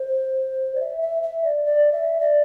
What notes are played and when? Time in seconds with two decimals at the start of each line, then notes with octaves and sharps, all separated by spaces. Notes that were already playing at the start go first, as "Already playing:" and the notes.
Already playing: C5
0.75 D5
0.80 E5
1.02 E5
1.23 E5
1.44 D5
1.65 D5
1.92 E5
2.20 D5